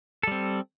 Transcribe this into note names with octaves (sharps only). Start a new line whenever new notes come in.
G3 C4 A4